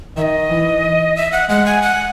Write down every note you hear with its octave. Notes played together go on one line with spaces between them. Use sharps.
D#3 E5
D#5
E3
E5
F#5
G#3 F#5
G#5
F#5